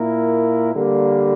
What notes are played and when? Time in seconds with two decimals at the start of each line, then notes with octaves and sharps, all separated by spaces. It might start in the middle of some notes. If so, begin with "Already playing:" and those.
Already playing: A#2 A#3 E4 A#4
0.72 D3 G3 A#3